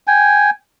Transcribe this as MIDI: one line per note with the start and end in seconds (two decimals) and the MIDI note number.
0.07 0.50 79
0.07 0.50 80